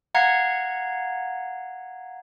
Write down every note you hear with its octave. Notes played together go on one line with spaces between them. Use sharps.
F5 F#5 A#5 G#6